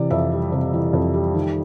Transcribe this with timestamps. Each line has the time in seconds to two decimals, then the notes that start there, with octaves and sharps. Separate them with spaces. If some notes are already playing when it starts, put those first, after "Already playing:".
Already playing: C3 E3 D5
0.10 F2 E5
0.32 G3
0.52 C3
0.73 E3
0.93 F2
1.14 G3
1.34 D#3